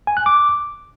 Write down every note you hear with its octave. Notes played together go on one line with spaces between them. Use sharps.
G#5
F#6
D6